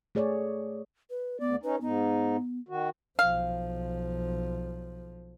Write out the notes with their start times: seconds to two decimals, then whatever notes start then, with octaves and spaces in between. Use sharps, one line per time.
0.15 A3 G#4 C#5 D5
1.10 B4
1.40 D2 B3 D5
1.63 C#4 D#4 B4
1.81 G#2 B3 D#4
2.69 D#3 F#4
3.19 B1 F3 F5